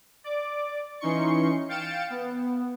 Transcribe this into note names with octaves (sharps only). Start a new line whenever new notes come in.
D5 D6
E3 C#4 D#4 C6 C#6 C#7
F5 G5 A6 C#7 D7 E7
B3